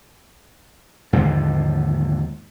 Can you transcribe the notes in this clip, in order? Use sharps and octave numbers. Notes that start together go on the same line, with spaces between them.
D#2 G#2 D3 F3